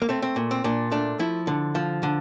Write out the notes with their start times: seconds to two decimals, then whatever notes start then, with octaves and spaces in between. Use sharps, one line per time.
0.02 A#3
0.09 A3 C4
0.22 C4
0.36 A#2
0.51 C4
0.64 A#2 D4
0.91 A3 D4
1.19 F3 E4
1.47 D3
1.75 F3
2.03 D3